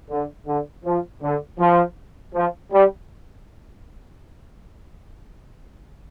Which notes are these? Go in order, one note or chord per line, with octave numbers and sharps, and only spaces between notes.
D3
D3
F3
D3
F3
F3
G3